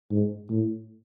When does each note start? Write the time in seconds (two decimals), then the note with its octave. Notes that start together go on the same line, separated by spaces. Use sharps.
0.10 G#2
0.50 A2